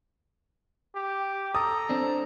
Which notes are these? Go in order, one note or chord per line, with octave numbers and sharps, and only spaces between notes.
G4
A4 A#5 D#6
C4 D4